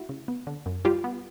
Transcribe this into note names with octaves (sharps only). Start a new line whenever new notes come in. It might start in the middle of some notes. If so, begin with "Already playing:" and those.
Already playing: A3 E4 F#4
C#3
B3
D3
F#2
G3 F4 G4
B3